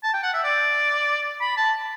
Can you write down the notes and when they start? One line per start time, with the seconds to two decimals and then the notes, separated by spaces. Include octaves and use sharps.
0.03 A5
0.13 G5
0.23 F#5
0.34 E5
0.44 D5
1.41 B5
1.57 A5